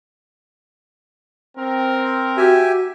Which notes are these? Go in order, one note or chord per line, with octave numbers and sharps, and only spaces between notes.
C4 A#4
F#4 G4 E5 G#5